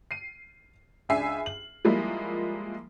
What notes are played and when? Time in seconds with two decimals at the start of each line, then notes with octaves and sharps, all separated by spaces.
0.11 C7 D#7
1.09 C#2 D4 E5 G#5 C7
1.46 F#7
1.85 F3 G3 G#3 A#3 E4